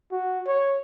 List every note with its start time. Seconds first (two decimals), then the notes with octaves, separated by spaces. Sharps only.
0.12 F#4
0.47 C#5